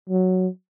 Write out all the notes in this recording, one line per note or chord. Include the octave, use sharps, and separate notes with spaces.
F#3